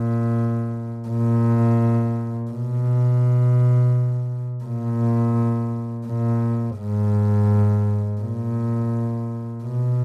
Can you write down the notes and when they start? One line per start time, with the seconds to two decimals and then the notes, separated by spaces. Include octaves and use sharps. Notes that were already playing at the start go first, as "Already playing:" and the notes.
Already playing: A#2
1.08 A#2
2.51 B2
4.64 A#2
6.07 A#2
6.78 G#2
8.21 A#2
9.63 B2